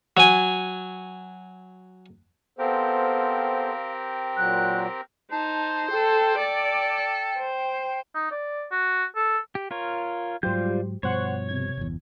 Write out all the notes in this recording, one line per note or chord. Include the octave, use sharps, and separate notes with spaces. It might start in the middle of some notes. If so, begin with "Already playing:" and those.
F#3 G#5
B3 C4 G4 A4 A#4 C5 F5
A#2 F#3 F#6
D#4 C5 A5
A4 G5
A4 D5
C5
D#4
D5
F#4
A4
G4
F4 A#4 C#5
G#2 F#3 G3 F4 G4 C5 G6
G2 B2 F3 C5 C#5 F#5 C#6
C3 G#6
G1 E2